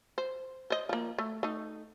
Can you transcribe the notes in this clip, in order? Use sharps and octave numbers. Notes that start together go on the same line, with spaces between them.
C5
C5 D#5
F3 A#3
A3
A3 D#4